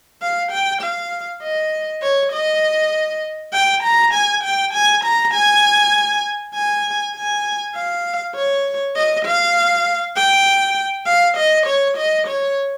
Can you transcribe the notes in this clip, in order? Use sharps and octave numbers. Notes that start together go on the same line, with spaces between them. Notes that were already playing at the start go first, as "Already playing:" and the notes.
F5
G5
F5
D#5
C#5
D#5
G5
A#5
G#5
G5
G#5
A#5
G#5
G#5
G#5
F5
C#5
D#5
F5
G5
F5
D#5
C#5
D#5
C#5